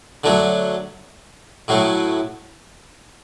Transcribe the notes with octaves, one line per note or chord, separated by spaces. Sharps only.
D3 F#3 A3
A2 F#3 A3